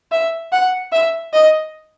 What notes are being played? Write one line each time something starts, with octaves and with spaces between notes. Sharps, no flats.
E5
F#5
E5
D#5